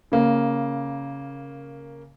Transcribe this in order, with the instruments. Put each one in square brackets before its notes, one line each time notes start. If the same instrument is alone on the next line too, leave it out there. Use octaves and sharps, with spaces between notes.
[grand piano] C#3 A#3